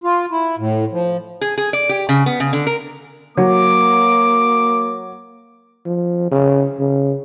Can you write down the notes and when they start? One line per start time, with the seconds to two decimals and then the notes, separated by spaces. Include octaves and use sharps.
0.04 F4
0.32 E4
0.58 A2
0.92 F3
1.41 G#4
1.58 G#4
1.73 D5
1.89 G4
2.09 C#3
2.26 B3
2.40 C#3
2.53 D3
2.67 A#4
3.37 F#3 A#3 D6
5.86 F3
6.31 C#3
6.79 C#3